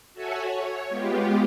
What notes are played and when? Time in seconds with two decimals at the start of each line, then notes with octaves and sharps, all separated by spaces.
0.14 F#4 A4 C#5 E5 F#5 G#5
0.46 C#5
0.89 G#3 B3 F4 G4